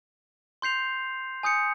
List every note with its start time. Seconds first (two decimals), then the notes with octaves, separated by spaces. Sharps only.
0.62 C6 G6 C7 F7
1.43 G#5 D#6 G6 C#7